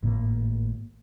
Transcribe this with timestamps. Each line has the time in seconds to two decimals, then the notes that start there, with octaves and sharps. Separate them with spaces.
0.03 G#1 A2 A#3